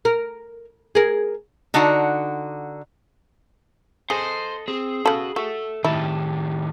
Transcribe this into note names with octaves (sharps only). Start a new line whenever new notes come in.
A#4
G#4 A#4
D3 D4 D#4 F#4 F#5 A5
G#4 A4 C5 D#5 C6
C4 G#4
C#3 F#4 A4 B5
F#4 A4 E5
A2 D#3 E4 G4 A5